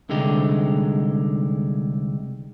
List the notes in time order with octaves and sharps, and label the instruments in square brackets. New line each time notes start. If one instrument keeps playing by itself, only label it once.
[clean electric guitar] C2 D3 G#3 D#4 G4